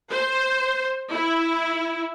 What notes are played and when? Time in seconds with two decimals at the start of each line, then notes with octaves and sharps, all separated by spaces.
0.11 C5
1.11 E4